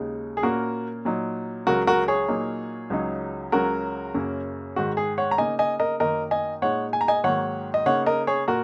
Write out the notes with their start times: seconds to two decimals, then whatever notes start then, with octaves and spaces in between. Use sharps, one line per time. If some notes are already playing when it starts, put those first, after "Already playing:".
Already playing: D#2 C#3 G#3 D#4
0.37 G#4
0.43 A#2 A#3 C#4 F#4 A#4
1.05 A#2 F#3 D#4
1.67 C#2 C#3 F#3 F#4 A#4
1.87 F#4 A#4
2.08 G#4 C#5
2.28 A#2 F#3 A#3 D#4
2.90 C#2 C#3 F#3 D#4
3.52 C#2 C#3 F#3 C#4 F#4 A#4
4.14 F#2 C#3 A#3 C#4
4.76 G#2 D#3 G#3 F#4
4.97 G#4
5.18 C#5 F#5
5.31 A#5
5.38 C#3 A#3 D#4 D#5 G#5
5.59 D#5 G#5
5.80 A#4 D#5
6.00 F#2 D#3 A#3 D#4 A#4 D#5
6.31 D#5 G#5
6.62 A#2 G#3 D#4 C#5 F#5
6.93 G#5
7.01 A#5
7.08 D#5 G#5
7.24 G#2 D#3 F#3 A#3 C#5 F#5
7.74 D#5
7.86 C#3 A#3 D#4 C#5 F#5
8.06 A#4 D#5
8.27 G#4 C#5
8.48 A#2 F#4 A#4